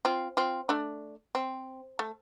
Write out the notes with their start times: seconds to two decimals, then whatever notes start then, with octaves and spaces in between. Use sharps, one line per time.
0.05 C4 F4
0.37 C4 F4
0.69 A3 D4
1.35 C4
1.99 A3